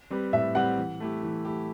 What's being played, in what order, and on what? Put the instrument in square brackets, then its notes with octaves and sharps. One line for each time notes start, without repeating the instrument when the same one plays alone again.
[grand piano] G3 C4 G4 B4
[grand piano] A2 [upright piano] E5
[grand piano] G3 C4 G4 B4 [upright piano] F#5
[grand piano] E3
A3 E4 G4
E3
A3 E4 G4